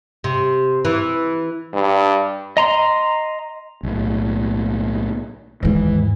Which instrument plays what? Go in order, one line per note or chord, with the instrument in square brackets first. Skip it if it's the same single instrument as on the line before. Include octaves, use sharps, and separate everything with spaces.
[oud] C3
E3
[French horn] G2
[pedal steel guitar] D#5 A#5 C6
[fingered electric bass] B1 A2
[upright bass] D#2 G#2 [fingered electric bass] E3